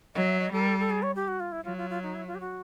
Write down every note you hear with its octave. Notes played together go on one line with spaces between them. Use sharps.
F#3 D#5
E5
D#5
G3 A4
A#4
A4
A4
G#4
C#5
G4
F#4
F4
E4
F#3 F4
F4
F4
D#4
E4
F4
G4
F#4